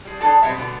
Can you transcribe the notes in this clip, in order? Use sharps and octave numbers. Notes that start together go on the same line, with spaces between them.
G3 G#4
D4 G#4 A4 D5 A5
B2 G3 G#3 C4 C#5 E5
B2 D3 G3 B3